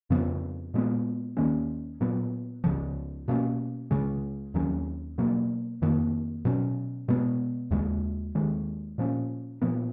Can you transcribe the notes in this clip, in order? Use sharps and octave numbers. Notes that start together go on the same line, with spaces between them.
F2 C#3 F3 B3
A#2 G#3 B3
D#2 D#3 A#3 C#4
A#2 F#3 B3
C#2 C#3 F3
B2 A#3 C#4
C#2 C#3 G#3
D#2 D#3 F#3 C#4
B2 F#3 A#3
F2 D#3 A#3
B2 F#3 C#4
B2 G#3 B3
D#2 C#3 G#3
D#2 D#3 G#3
A#2 F3 A#3 C#4
A#2 F3 B3